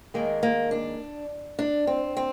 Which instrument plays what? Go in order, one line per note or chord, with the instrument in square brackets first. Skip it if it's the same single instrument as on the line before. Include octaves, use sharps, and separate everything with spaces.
[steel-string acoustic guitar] D#2 D#3 G#3 A#3
A#3
D4
D4
C4
C4